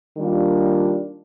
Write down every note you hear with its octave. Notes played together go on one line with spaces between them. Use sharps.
D#3 G3 A#3 D4 F4